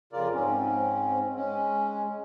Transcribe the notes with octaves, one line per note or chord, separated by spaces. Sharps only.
F2 C#3 F4 A#4 D5
G#2 C4 C#4
G#3 C#4